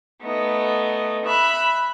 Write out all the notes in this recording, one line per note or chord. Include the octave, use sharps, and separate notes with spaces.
A3 B3 D#4
E5 B5 F#6